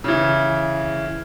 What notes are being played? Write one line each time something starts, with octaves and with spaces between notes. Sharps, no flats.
C#3 E3